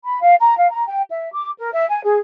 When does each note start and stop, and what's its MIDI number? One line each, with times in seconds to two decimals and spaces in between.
0.04 0.18 83
0.21 0.35 77
0.40 0.56 82
0.58 0.69 77
0.70 0.85 82
0.88 1.02 79
1.10 1.29 76
1.32 1.50 86
1.58 1.71 70
1.72 1.85 76
1.89 2.01 80
2.03 2.17 68